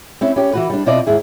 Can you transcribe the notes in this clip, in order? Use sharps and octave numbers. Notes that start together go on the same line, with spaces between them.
C4 C#4 E4
C#4 G4
E3 F#4 B4
G3 D4
B2 C4 E4 F4 D5 D#5
D#2 G#2 E4 G#4